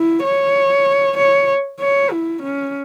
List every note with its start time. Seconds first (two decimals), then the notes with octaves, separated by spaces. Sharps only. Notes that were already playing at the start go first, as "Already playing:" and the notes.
Already playing: E4
0.23 C#5
1.18 C#5
1.80 C#5
2.11 E4
2.43 C#4